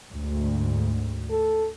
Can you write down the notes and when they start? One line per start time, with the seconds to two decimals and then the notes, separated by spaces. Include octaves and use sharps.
0.11 D2 G#2
1.31 A4